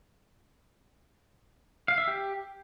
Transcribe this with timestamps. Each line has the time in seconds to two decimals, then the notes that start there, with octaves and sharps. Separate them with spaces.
1.88 F5
1.98 E5
2.08 G4